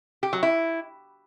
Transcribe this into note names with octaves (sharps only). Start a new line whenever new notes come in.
G4
F#3
E4